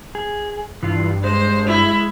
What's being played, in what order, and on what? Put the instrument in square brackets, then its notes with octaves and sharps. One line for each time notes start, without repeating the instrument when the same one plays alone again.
[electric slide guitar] G#4
[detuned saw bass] G2 [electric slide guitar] E3 F4
[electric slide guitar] G#3 [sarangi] C5
[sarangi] E4